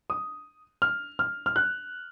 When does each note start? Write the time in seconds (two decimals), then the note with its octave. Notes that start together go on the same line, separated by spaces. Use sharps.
0.10 D#6
0.82 F6
1.19 F6
1.46 F6
1.56 F#6